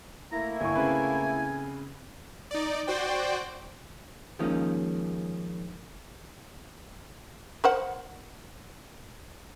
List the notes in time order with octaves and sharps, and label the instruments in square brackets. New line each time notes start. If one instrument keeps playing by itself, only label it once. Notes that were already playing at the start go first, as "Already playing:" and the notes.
[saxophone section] A3 A#3 E4 [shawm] A#5
[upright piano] G1 C#6 [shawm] G#5
[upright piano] C#3 C4 B4
[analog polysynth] D#4 D5
F#4 C5 D5 G5
[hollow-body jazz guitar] D#3 F3 G#3 A#3 C#4 D#4
[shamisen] A#4 C5 F#5